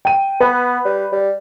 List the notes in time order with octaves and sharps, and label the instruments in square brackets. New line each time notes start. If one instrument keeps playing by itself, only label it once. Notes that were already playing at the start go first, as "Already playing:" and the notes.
[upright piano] G5 D#7
[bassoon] B3 [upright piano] B4
[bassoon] G3
G3